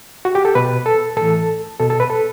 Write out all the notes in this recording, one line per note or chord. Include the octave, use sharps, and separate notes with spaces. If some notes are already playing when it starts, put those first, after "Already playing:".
F#4
G4
A4
B2 B4
A4
A2 E3 A4
B2 A4
A4
B4
A4